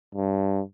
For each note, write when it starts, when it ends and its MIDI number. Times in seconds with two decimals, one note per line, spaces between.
0.15 0.61 43